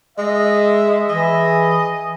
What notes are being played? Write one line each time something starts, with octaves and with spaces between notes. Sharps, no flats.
G#3 D#5 E5
E3 G#4 D#5